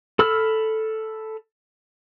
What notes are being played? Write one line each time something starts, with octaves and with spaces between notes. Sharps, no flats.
A4 B5 E6 F6